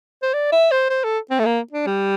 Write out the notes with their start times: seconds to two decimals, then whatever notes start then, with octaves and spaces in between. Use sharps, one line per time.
0.23 C5
0.33 D5
0.52 E5
0.71 C5
0.90 C5
1.04 A4
1.30 C4
1.39 A3
1.45 A#3
1.72 D4
1.86 G3